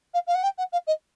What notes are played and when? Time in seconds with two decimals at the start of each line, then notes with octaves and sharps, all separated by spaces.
0.14 F5
0.27 F5
0.35 F#5
0.43 G5
0.58 F#5
0.72 F5
0.87 D#5